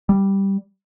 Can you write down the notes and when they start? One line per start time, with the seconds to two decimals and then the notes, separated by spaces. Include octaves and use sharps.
0.09 G3